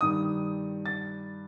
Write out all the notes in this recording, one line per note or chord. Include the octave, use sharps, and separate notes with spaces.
G2 D#3 D#6
A6